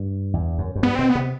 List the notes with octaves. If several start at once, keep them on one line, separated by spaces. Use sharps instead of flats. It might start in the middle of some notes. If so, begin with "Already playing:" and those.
Already playing: G2
E2
F#2
F#2
G2 B3
B2 C4
B3
C3